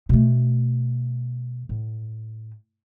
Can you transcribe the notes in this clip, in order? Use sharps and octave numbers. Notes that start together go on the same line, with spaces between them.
B2 A3
A2